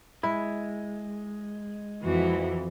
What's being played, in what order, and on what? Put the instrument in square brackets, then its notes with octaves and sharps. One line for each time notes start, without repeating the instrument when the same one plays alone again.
[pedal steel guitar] G#3 [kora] E4
[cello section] F2 E3 [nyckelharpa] F#4